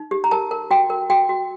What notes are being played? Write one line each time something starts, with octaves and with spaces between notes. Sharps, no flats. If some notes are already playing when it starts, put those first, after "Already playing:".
Already playing: D#4
G4
A#5
A#4 A5
A#4
F#4 G5
A#4
F#4 G5
F#4